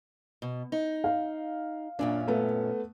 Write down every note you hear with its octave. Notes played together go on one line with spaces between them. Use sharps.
B2
D#4
F5
F#2 A#2 C#4 D4
A3 B3